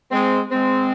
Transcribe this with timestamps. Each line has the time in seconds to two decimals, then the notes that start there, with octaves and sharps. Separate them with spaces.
0.11 G#3 C4
0.52 G#3 C4